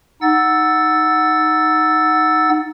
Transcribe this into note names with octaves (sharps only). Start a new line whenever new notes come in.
D#4 F#5 E6 A6